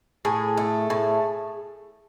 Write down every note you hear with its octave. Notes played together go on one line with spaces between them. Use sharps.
A2 G#4
A3
A2